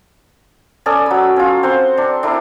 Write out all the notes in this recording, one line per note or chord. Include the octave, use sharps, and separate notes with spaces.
C#4 A4 D5 D#6
F#3 B5
C#4 F4
C4 F#5 C6
D4
D4 E4 A#4